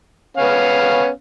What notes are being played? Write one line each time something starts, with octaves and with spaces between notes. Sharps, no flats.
B3 C#4 F5